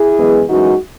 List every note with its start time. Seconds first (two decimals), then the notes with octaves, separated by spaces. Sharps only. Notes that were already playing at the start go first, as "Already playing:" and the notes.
Already playing: E4 G#4
0.18 F#2 E3 G#3 B3
0.48 F#2 E3 G#3 C#4 D#4 F#4